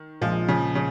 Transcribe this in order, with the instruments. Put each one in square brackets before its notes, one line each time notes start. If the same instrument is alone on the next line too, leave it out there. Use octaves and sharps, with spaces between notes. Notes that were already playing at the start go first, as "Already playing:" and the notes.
Already playing: [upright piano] D#3
[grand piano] A#1 A#2 G#3 F4 A#4 [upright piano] F3
[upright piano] C#3
C#3